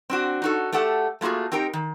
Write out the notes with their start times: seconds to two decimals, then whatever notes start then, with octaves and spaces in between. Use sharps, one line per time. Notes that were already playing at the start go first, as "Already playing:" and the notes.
0.10 C4 D4 F#4
0.42 D#4 F#4 A4
0.72 A3 G4 A4 F#5
1.21 A3 A#3 F4 F#4 G#4
1.52 C4 D#4 G4 A#4 G5
1.73 D#3